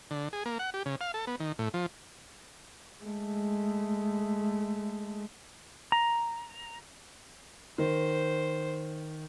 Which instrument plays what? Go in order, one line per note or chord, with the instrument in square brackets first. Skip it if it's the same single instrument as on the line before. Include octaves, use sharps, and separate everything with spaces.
[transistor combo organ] D3
G#4
A#3
F#5
G4
C#3
F5
A4
B3
D#3
A2
F3
[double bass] G#3 A3
[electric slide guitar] A#5
[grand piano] D#3 [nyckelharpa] C5